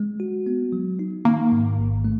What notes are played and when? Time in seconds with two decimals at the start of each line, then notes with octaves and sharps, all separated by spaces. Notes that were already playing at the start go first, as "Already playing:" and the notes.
Already playing: G#3
0.20 F#4
0.47 B3
0.72 F#3
0.99 D#4
1.25 D#3 A#3
1.52 G#2
1.78 A1
2.05 A3